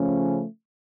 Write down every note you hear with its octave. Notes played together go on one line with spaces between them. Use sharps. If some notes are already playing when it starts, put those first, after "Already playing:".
Already playing: C#3 F3 A3 C#4